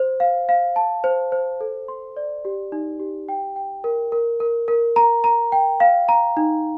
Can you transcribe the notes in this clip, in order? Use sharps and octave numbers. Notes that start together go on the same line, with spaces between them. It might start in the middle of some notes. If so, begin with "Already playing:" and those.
Already playing: C5
F5
F5
A5
C5
C5
A4
C6
D5
G4
D#4
G4
G5
G5
A#4
A#4
A#4
A#4
A#5
A#5
G5
F5
A#5
D#4